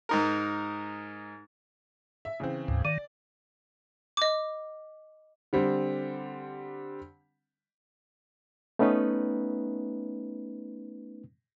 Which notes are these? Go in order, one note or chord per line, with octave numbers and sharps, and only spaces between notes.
G#2 D#4 A#4
E5
C#3 E3 C4
D2 G#2
D#3 D5
D#5 D6
D3 G3 C4
A3 B3 C#4 D#4 B4